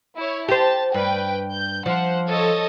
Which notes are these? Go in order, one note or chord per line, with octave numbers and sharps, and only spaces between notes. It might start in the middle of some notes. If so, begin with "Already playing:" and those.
E4 C#5
G4 C5 A5
G2 B4 G5
G6
F3 C5 F#5
A4 C#5 D#5